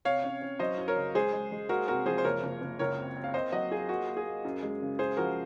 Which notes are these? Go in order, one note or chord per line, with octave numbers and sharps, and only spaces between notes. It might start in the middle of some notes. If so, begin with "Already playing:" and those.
C3 C#5 F5
C#4
C#4
F#3 C5 D#5
F#2
A#4 C#5
C#3
G#3 G#4 C5
G#3
G#3
A#3 F#4 A#4
C3 F#4 A#4
F3 G#4 C5
C5
F#1 A#4 C#5
F#1
F#1
C#2 A#4 C#5
C4
C4
F5
A#3 C5 D#5
F#3 D#5 F#5
F4 G#4
A#3 F#4
A#3
G#4
A#3
F#2
G#3
C#3
F#2 G#4 C5
F3 F#4 A#4